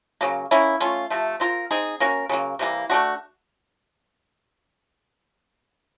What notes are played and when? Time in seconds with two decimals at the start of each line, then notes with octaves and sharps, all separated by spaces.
0.21 C#3 F#3 A#3
0.51 A#3 C#4 E4
0.80 A3 C#4 F4
1.10 C3 F3 A3
1.40 C4 F4 A#4
1.71 C4 D#4 G#4
2.00 A#3 C#4 F#4 A#4
2.29 C#3 F#3 A#3
2.59 C3 E3 G3 A#3
2.90 A3 D4 F#4